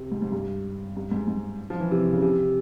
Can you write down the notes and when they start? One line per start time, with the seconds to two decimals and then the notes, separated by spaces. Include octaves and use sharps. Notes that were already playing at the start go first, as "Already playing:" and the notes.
Already playing: C3
0.12 G#2
0.22 G#2
0.32 G2
0.97 G2
1.11 G#2
1.28 G#2
1.70 F3
1.80 E3
1.91 C3
2.02 C3
2.12 C#3
2.22 C3